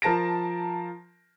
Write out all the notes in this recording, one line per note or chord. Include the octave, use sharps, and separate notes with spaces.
F3 A#4 A5 A#6 D7